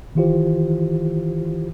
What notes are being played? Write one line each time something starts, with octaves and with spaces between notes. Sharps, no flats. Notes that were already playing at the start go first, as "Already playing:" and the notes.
D#3 E3 E4 F4 G4 C5